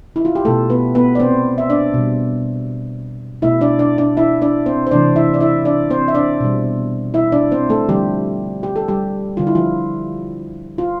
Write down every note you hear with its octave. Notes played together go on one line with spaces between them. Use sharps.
E4
F4
G4
B2 A3 A4
B3 B4
B3 B4
D5
C4 C5
E5
D4 D5
B2 G3
B2 A3 E4 E5
D4 D5
D4 D5
D4 D5
E4 E5
D4 D5
C4 C5
C5
C3 E3 A3 D4 D5
E4 E5
D5
E4 E5
D4 D5
C4 C5
E5
D4 D5
B2 G3
E4 E5
D4 D5
C4 C5
A3 A4
D3 F3 G3 A3 G4
G4
A4
G3 G4
D3 G3 F4
E4
F3 F4
F4